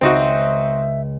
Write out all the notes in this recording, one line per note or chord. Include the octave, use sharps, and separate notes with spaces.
C#2 C#3 C4 D#4 F#4 E5